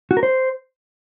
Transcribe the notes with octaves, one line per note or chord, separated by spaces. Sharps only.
F#4
A#4
C5